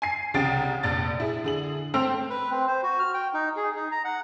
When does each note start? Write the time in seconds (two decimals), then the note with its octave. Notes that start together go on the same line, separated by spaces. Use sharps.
0.02 G#5 C7
0.34 C2 C#3 G5 D#6 A6 D7
0.83 F1 A#1 A6
1.20 E4 G#4
1.44 D3 G#4 F#7
1.94 A3 C4 G5 E6 F7
2.30 B4
2.51 C4
2.67 C5
2.83 F#4
2.99 F6
3.14 G5
3.34 D#4
3.56 G#4
3.76 D#4
3.92 A#5
4.05 F#5